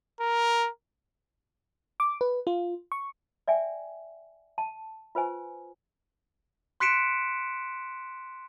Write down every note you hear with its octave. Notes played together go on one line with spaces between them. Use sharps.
A#4
D6
B4
F4
C#6
D5 E5 G5 G#5
A5
F4 B4 C5 G#5
C6 F#6 B6 C#7 D7 E7